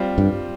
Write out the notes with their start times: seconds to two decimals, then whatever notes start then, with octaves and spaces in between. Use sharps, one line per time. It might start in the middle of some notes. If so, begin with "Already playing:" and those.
Already playing: G3 C4 F4
0.18 G2